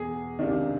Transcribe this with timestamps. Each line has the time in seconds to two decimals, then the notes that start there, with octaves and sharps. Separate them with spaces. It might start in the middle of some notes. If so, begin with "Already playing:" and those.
Already playing: E2 B2 G#4
0.39 C#2 C3 D#3 D4